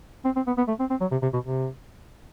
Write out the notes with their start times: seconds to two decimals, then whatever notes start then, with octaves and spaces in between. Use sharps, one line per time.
0.25 C4
0.36 C4
0.47 B3
0.57 B3
0.68 A3
0.80 C4
0.90 C4
1.01 F#3
1.11 C3
1.22 C3
1.33 B2
1.44 C3